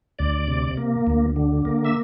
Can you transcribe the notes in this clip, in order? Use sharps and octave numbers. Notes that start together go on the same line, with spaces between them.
D2 D5
C3
A#3
D2
D3
A#3
E5